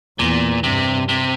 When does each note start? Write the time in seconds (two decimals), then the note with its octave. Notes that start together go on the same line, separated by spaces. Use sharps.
0.19 E2 A#2
0.63 G2 C3
1.09 C3